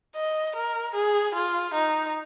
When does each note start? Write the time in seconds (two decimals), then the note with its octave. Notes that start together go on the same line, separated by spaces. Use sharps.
0.16 D#5
0.56 A#4
0.95 G#4
1.35 F4
1.74 D#4